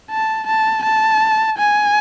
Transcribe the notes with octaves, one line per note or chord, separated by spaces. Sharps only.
A5
A5
A5
G#5